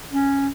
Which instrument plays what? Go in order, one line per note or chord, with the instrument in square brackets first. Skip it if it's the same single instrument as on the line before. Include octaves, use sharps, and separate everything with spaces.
[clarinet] C#4